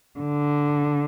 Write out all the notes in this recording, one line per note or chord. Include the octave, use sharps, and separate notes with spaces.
D3